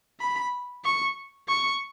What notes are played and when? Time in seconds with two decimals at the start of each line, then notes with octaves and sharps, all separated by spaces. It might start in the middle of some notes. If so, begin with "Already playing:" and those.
0.20 B5
0.84 C#6
1.48 C#6